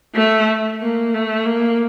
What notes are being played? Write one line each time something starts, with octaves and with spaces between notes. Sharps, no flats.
A3
A#3
A3
A#3